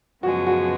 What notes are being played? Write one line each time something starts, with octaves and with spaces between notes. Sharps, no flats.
F#2 C#3 F3 G#3 B3 F#4
F#4